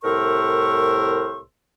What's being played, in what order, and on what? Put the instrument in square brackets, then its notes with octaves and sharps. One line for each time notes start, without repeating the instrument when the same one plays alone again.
[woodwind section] C2 A2 A#4 C5 E5 C#6